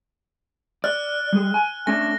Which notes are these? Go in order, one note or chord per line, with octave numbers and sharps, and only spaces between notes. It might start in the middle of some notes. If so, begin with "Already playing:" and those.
D5 F6 F#6
G3 G#4
G#5
A3 C#4 D4 A#6